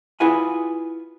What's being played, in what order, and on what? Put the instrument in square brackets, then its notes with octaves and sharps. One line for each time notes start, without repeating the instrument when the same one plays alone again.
[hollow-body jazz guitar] E4 F4 G#4 B4 F#5 G#5